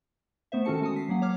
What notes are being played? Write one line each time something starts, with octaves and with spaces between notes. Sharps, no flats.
A3 B3 C5 E5
D#3 C#4 F#4 A4 A5 C#7
G#3 G#5 A5 D#6
B6 C7
F#3 A#3 F#5
C#5 D6 F6